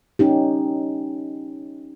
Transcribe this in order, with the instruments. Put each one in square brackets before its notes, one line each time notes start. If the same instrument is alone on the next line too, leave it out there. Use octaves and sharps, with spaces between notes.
[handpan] C#4 D#4 G4